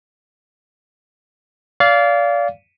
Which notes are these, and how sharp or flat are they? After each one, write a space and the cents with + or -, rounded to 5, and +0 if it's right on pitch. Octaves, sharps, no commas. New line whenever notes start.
D5 -30 F5 -5